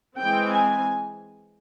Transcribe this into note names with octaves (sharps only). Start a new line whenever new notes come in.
E3 G#3 C4 G5
G#5